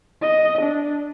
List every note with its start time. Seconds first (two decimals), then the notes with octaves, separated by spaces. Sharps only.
0.22 D#5
0.62 D4